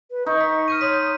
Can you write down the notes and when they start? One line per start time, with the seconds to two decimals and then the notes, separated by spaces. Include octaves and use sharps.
0.11 B4
0.26 D#4 C#6
0.41 B6
0.68 F6 G6 D#7
0.81 C#5 C6 D#6 B6